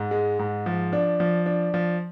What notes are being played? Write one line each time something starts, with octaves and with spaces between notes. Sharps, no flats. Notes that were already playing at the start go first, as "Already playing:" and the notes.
Already playing: G#2
G#3
G#2
F3
D4
F3
D4
F3